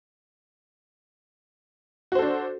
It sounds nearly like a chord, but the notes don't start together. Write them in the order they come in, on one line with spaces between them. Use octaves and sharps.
F#4 C5 A4 D4